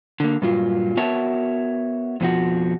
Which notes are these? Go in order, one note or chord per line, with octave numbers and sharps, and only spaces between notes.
D3 A#3
G2 A#2 F#3 F4
B3 F#4 A#4 C#5 E5 A5
F2 B2 F3 F#4